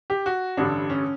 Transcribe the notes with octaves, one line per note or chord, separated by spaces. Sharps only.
G4
F#4
A1 G2 D3 G3 D4
C#4